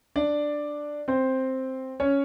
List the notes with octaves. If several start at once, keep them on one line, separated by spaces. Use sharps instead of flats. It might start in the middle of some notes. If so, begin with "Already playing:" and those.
D4 D5
C4 C5
C#4 C#5